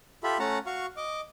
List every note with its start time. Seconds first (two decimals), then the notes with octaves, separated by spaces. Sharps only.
0.23 F4 G4 A4 E5 B5
0.39 A3 C#4 F#5 A5 A#5
0.66 F#4 F5 C#6
0.97 D#5 D6